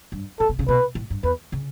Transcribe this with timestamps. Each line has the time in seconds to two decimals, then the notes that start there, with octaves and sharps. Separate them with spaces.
0.12 G2
0.40 A2 A4
0.49 B2
0.59 C#3
0.68 B2 B4
0.95 A2
1.10 G2
1.23 E2 B4
1.52 C#3